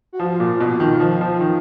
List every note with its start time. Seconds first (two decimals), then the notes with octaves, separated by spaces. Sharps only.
0.13 F#4
0.20 F3 F4
0.40 A#2
0.60 B2 F4
0.80 D#3
1.00 F3
1.21 F3
1.41 D#3